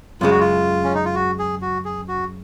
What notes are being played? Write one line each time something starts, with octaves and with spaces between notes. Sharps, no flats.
F#2 C#3 G#3 F4
F#4
F4
C#4
D#4
F4
F#4
G#4
F#4
G#4
F#4